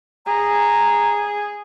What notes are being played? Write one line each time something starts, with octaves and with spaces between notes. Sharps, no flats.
G#4 A#5